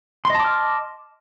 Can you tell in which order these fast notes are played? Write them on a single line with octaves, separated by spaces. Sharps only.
C6 D#5 A5 D6 F6